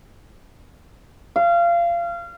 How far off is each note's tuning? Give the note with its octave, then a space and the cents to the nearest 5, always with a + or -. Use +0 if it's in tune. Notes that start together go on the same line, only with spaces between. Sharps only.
F5 -25